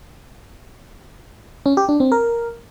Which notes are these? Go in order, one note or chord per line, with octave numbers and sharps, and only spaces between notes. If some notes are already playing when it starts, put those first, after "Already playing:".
C#4
G4
D4
C4
A#4